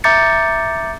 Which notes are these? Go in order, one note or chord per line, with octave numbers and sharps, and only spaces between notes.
E5 A#5 D6 G6 A6 C#7